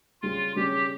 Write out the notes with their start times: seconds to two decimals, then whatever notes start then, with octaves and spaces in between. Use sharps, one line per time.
0.22 C#3 G3 C#4 F4
0.56 C#3 G3 C#4 G4